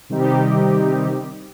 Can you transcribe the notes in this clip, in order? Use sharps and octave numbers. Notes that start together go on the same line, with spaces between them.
C3 D#3 G3 C4 D#4 G4